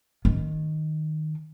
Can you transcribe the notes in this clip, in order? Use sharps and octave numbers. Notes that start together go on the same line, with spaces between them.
D#3